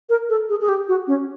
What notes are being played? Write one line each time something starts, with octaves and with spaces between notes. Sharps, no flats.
A#4
A4
G#4
G#4
G4
F#4
C#4